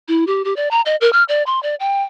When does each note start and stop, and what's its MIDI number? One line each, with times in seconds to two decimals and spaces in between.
0.08 0.25 64
0.27 0.43 67
0.45 0.56 67
0.56 0.71 74
0.71 0.81 82
0.86 0.96 75
1.01 1.11 70
1.13 1.23 89
1.29 1.43 74
1.46 1.61 84
1.63 1.75 74
1.80 2.02 79